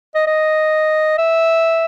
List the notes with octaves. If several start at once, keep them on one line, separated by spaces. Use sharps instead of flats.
D#5
D#5
E5